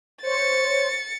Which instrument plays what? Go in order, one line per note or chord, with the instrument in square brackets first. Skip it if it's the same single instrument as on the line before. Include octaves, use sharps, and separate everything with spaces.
[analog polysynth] C5 C#5 [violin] A6 C#7